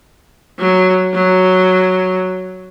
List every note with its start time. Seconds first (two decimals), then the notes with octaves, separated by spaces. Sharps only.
0.59 F#3
1.14 F#3